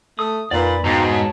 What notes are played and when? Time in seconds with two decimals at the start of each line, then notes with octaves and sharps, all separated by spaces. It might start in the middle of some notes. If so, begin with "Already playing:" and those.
0.19 A3 D#6
0.51 F2 A#2 B4 D5 B5
0.84 G#2 B2 F5 G5 A#5
1.12 C#5 A5